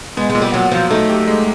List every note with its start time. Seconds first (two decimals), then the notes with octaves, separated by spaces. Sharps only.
0.17 G#3 B3
0.30 G#3
0.35 A#2
0.42 G3
0.54 A#2 F#3
0.71 F3 F#3
0.90 A3 D#4
1.09 G4
1.28 G#3